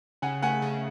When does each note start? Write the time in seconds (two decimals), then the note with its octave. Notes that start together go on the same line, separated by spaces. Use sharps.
0.22 C#3 F#5 G#5
0.42 A3 F#5 G#5
0.62 C#3